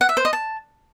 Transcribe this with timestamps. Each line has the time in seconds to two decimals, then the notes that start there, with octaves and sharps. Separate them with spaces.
0.01 F#5
0.09 E5
0.17 C5
0.25 D#5
0.33 A5